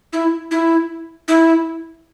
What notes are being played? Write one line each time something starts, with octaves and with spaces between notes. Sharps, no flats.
E4
E4
E4